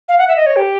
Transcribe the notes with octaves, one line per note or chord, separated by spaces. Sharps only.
F5
F#5
E5
D#5
C#5
G4